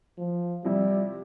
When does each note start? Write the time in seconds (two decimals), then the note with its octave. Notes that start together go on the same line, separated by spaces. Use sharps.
0.18 F3
0.65 C3 F3 G3 E4